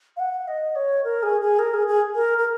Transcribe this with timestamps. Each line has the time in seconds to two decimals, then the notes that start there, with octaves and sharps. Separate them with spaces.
0.17 F5
0.20 F#5
0.48 D#5
0.76 C#5
1.04 A#4
1.23 G#4
1.41 G#4
1.59 A#4
1.74 G#4
1.87 G#4
2.15 A#4
2.38 A#4